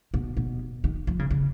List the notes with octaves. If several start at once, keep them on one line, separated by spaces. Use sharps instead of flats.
B2
B2
D#3
F3
C#3
C#3